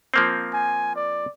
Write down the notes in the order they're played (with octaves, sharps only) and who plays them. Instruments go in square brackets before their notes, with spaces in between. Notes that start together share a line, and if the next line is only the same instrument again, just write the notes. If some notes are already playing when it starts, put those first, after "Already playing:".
[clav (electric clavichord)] F3 A#3 C4
[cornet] G#5
D5